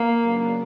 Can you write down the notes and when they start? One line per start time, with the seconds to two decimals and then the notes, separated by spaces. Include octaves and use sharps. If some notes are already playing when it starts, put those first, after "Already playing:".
Already playing: A#3
0.21 C#3 F#3 B3 D4